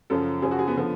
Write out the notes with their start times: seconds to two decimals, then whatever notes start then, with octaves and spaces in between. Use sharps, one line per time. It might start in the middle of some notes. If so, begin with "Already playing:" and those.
0.10 F#2 C#3 F3 A4
0.42 F#2 C#3 F3 G#4
0.51 F#4
0.59 G#4
0.68 B3
0.77 D3 F3